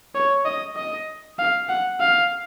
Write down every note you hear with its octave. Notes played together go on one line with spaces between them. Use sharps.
C#5
D#5
D#5
F5
F#5
F5